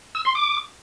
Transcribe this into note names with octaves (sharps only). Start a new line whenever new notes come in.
E6
C6
D6